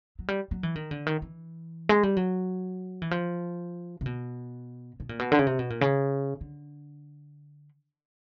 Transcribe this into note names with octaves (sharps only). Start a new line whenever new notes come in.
F#3
G3
F#3
E3
D#3
D3
D#3
E3
G#3
G3
F#3
E3
F3
C3
B2
B2
A#2
B2
D3
C#3
C3
B2
A#2
C#3
D3